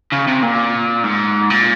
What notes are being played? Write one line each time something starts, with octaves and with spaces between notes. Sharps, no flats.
C#3
C3
A#2
G#2
A#2